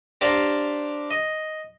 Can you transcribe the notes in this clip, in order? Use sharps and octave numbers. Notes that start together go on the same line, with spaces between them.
D4 G4 C5 D5 F5 A#5
D#5